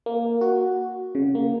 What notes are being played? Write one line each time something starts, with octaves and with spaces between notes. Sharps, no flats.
A#3
F#4
C#3
A#3